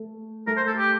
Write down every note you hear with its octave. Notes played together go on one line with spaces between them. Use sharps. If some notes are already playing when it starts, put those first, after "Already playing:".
Already playing: A3
A3 A#4
C5
A4
G4